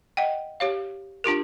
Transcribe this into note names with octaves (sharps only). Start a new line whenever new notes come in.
D#5 F#5 G5
G4 C#5 F5
D4 F4 G4 A#4